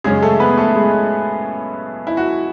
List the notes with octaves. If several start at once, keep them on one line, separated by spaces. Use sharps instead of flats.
F#2 C#3 G#3 C#4 G#4
A3 A4
B3 B4
A3 A4
G#3 G#4
E4
F#4